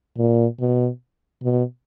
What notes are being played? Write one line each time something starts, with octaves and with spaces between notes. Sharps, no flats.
A#2
B2
B2